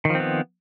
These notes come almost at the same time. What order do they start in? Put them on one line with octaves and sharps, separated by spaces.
D#3 F3 C4 B3